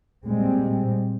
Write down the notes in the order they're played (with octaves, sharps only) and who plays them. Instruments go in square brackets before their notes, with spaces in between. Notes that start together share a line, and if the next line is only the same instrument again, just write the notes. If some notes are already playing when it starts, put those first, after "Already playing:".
[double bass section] A#2 G3 G#3 C4